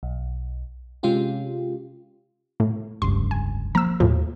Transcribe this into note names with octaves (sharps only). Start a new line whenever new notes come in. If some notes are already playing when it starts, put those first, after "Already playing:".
B1
C3 G#3 C#4 F4 G4
A2
F1 C#2 G2 C6
G#5
F3 A#3 A#5 E6
D#2 A2 F3